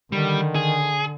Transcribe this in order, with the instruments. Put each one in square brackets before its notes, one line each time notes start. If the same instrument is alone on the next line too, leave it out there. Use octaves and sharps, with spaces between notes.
[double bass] D3 [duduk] D#3 [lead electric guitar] G3
[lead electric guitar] G#4